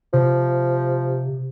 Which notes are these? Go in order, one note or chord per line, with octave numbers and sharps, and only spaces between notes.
C3 F3